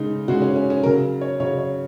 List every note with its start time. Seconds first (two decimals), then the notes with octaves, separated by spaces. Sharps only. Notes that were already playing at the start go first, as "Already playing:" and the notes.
Already playing: C#3 G#3 D#4
0.28 C#3 G#3 F#4
0.42 C#4
0.56 C#4
0.70 C#4
0.83 C#3 F#3 A#4
1.21 C#5
1.40 C#3 F#3 C#5
1.58 C#5